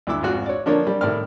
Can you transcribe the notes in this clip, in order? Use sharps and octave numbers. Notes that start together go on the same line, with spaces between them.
D2 G2 E4 D6 E6
G#1 F2 F4 F#4 F#6
C#5 D5
D3 F3 A#3 D4 A#4 C#5
G3
A2 C3 D#3 C4 D5 F6